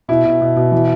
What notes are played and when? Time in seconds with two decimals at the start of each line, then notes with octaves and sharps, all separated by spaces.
0.08 B2 E4
0.25 B2
0.41 B2
0.56 B2
0.72 E3